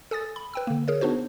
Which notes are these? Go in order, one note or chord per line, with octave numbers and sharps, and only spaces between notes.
A4 G#5 D#6 A6
B5
B4 G5 E6
D3 A#3
G#4 A#4 C#5
B3 D4 D#4 F#4 C5